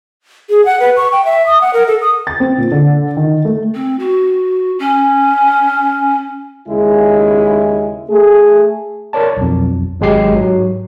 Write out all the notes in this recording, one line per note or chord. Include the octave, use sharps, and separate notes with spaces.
G#4
F#5
B4
C#6
G5
E5
D#6
F#5
A#4
A4
D#6
A6
C4
A#2
D3
D#3
A3
C4
F#4
C#4
D#2 C#3 G#3 E4 G#4
A3 G#4
A#4 C#5 D5 A5
B1 F2
G#1 F#3 G#3 G4 C7
G#2 F#3